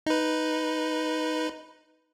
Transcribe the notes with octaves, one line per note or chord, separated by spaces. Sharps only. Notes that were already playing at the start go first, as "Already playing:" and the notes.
D#4 B4